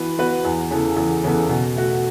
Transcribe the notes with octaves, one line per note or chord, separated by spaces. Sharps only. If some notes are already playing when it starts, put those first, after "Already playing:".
Already playing: E3 B3 F#4 B4
B3 F#4 B4
E2
C#3 E3 B3 A4
E2
C#3 E3 B3 A4
B2
A3 F#4